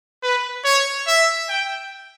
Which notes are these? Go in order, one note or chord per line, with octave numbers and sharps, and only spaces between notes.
B4
C#5
E5
G5